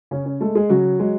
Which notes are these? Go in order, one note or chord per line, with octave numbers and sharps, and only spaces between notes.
C#3 C#4
C#4
G#3 A3 A4
G#3 G#4
C#3 F#3 F#4
G#3